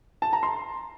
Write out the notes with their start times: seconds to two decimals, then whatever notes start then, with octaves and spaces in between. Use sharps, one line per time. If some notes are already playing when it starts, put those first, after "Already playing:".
0.22 A5
0.33 A#5
0.43 C6